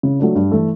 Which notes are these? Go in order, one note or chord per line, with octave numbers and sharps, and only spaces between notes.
C#3
F#3 A3 D4
G2
E3 A3